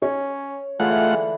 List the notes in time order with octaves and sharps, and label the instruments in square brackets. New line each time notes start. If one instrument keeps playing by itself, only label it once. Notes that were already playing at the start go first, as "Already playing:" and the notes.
[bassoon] C#4 [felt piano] C#5
[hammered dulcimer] D3 E3 [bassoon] G#3 [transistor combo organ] A3 F4 F#5